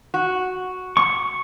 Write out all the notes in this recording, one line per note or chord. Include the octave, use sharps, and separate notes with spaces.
F#4
C#6